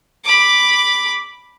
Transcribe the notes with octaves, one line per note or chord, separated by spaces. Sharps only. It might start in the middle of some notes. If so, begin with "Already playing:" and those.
B5 D6